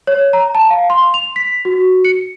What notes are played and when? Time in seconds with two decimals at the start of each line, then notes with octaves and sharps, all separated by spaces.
0.07 C#5
0.33 A#5
0.55 A5
0.70 F5
0.90 C6
1.14 F7
1.36 B6
1.65 F#4
2.05 C#7